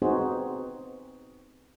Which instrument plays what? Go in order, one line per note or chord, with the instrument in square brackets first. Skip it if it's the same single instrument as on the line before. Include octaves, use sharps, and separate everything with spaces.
[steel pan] B3 C4 D#4 F#4 G#4 C5